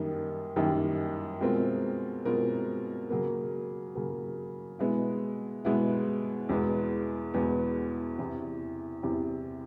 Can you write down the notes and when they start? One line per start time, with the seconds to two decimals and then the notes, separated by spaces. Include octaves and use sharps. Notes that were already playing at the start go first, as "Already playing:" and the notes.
Already playing: F#2 D#3 G3 A#3 D#4
0.56 F#2 D#3 G3 A#3 D#4
1.41 B2 G#3 C4 F4 A#4
2.25 B2 G#3 C4 F4 A#4
3.10 C#3 F#3 A#3
3.95 C#3 F#3 A#3
4.79 B2 G#3 B3 E4
5.65 B2 G#3 B3 E4
6.49 E2 B2 G#3 B3
7.34 E2 B2 G#3 B3
8.19 E2 C3 E3
9.03 E2 C3 E3